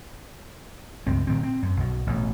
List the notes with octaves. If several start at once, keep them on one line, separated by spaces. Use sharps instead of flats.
C#2 G2 C4
A#2 D#3 C4
C4
F#2
B1 B2
A1 B2